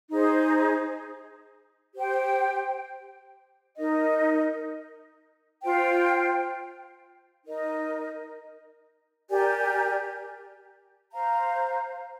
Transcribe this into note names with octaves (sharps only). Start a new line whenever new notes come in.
D#4 G#4 C5
G4 C5 G5
D#4 A#4 D#5
F4 C5 G5
D#4 A#4 D#5
G4 A#4 D5 G#5
C5 F5 A#5